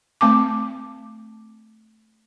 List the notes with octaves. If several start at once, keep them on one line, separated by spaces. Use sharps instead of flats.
A3 C4 A5 D6